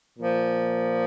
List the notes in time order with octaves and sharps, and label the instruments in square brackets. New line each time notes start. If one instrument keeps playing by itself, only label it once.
[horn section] A#2 F3